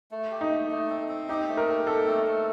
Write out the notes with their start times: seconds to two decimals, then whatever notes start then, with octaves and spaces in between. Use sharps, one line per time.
0.11 A3
0.31 G4
0.41 D#4
0.50 A3
0.70 A3
0.90 C4
1.08 C4
1.29 D#4 G4
1.48 A3
1.57 A#4
1.68 G4
1.87 C4 A4
2.07 A3
2.27 A3